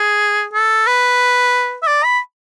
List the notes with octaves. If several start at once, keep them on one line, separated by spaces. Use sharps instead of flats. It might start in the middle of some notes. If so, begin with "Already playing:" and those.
Already playing: G#4
A4
B4
E5
D5
B5